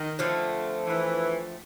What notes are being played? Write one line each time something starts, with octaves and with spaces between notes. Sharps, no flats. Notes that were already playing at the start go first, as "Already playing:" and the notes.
Already playing: D#3
D3 F3 A3 C4
E3